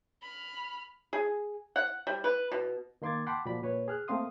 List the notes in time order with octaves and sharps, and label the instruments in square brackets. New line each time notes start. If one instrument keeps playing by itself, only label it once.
[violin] B5 F6
[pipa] G#4
F#5
G3
B4
B2
[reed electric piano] D#3 A#3 C6 D6 G#6 A6
F#5 G5 A5 B5 C6 D6
A#2 F3 F#4 D5 B5
A#2 B4 C#5
G#4 F6 F#6
A3 A#3 C4 F5 C6 D#6